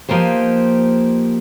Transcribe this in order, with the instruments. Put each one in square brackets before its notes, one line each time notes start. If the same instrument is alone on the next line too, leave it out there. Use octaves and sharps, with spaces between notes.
[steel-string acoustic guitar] F3 A#3 D#4 G4 C5